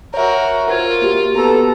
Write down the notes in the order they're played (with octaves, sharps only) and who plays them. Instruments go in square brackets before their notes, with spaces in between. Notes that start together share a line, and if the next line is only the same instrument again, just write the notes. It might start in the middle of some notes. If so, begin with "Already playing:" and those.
[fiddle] F#4 A#4 [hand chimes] C#5 E5
[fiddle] F4 [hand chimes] A#4 C5 G#6
[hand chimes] A#3 F#4 G4
[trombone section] B3 A4 [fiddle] A#5